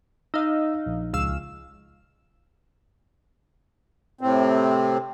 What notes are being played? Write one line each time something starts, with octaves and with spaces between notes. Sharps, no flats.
D#4 D#5 F5 E6
A#1
C#2 F5 E6
A2 C3 C4